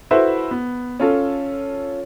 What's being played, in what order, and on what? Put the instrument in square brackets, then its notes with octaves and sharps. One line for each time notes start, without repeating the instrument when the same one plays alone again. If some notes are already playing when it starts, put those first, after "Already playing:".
[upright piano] E4 F#4 A4 B4 C5 E5
B3
C#4 F4 A4